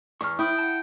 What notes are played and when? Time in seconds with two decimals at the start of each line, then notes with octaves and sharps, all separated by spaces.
0.21 E2 C#6 F6
0.39 E4 C5 G5 B5 D#6
0.58 F#5 A5